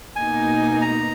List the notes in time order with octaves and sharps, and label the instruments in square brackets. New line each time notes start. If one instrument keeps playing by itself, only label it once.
[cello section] B2 A#3 D#4 [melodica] G#5
[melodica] A#5